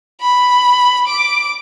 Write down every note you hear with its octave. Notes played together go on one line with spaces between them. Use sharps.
B5
D6